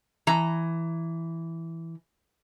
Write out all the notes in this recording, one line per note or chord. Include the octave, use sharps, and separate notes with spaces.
E3 A#5